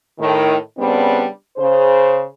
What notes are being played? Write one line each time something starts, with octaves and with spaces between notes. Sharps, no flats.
A2 D#3
C#3 G3 B3 C4 D4
C#3 C5